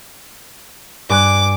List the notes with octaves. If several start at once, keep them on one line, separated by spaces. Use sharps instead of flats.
G2 G#5 D6 F#6